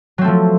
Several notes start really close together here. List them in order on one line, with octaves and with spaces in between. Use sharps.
F#3 C4 A3 F3